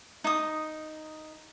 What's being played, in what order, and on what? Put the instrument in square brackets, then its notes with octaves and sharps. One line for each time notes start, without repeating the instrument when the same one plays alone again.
[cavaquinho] D#4 D#6